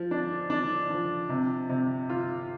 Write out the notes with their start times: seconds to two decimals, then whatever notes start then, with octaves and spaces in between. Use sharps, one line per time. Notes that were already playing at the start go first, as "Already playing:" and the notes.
Already playing: F3
0.11 D4
0.50 D4
0.91 F3
1.29 C3
1.69 C3
2.10 F4